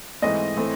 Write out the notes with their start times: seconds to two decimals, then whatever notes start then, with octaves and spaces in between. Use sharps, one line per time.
0.22 G#2 E3 A3 C4 D#5
0.57 A2 E3 A3 C4